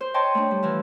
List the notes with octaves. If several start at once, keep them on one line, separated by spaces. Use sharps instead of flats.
C5
C#5 D#5 G5 A5 C6
A3 D4
G3
E3 F3